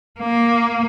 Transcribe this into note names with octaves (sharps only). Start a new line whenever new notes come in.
A#3